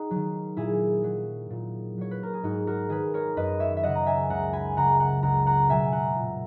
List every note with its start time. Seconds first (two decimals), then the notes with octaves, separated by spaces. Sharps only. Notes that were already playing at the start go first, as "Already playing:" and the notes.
Already playing: D#4 F#4 G#4
0.11 D#3 F#3
0.57 A#2 E4 G#4
1.04 F#3
1.50 A#2
1.98 F#3 C#5
2.11 B4
2.23 A#4
2.33 G#4
2.43 G#2 D#4 F#4
2.67 F#4 A#4
2.89 D#3 F#3 G#4 B4
3.14 A#4 C#5
3.36 F#2 B4 D#5
3.60 C#5 E5
3.77 E5
3.83 C#3 F#3 D#5 F#5
3.95 A#5
4.06 E5 G#5
4.29 C#2 F#5 A#5
4.53 G#5 B5
4.77 C#3 F#3 F#5 A#5
5.00 F#5 A#5
5.23 C#2 F#5 A#5
5.46 F#5 A#5
5.70 B2 F#3 E5 G#5
5.92 F#5 A#5
6.16 A#2